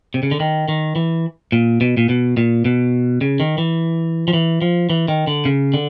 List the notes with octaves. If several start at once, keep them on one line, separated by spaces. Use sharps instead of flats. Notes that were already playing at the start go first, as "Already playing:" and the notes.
C3
C#3
D3
D#3
D#3
E3
A#2
B2
A#2
B2
A#2
B2
C#3
D#3
E3
F3
E3
F3
E3
D#3
D3
C#3
D3